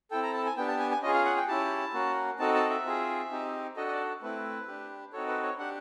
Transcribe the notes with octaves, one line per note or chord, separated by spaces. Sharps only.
C4 E4 A4 G5
A#5
A5
G#5
B3 D4 G4 G5
A5
G#5
G#5
C#4 F4 G#4 D#5
F5
F#5
G5
C#4 E4 G4 A5
A#3 C#4 F#4
C4 D#4 F#4 A4 A5
A5
E5
C4 F4 G#4
C4 D#4 G4
D4 F#4 A4 D#5
D#5
D5
A3 C4 E4 B4
D4 G4
C4 D#4 F#4 A4 C#5
B4
C#5
D4 G4 F#5